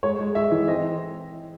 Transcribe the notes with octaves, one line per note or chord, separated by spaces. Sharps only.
G#3 C#5
G#3
G#3 E5
E3
C4 D#5